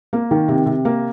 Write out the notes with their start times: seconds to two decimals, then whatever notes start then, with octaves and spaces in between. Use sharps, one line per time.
0.13 A#3
0.31 D#3
0.48 C3
0.66 C3
0.85 A#3